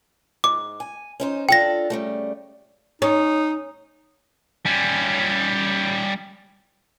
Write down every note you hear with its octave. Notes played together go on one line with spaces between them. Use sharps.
G#2 D6
G#5
C#4 D#4 C5
D4 F4 A4 G5 A#6
C#3 G3 A3
C#4 D#4
G3 C#4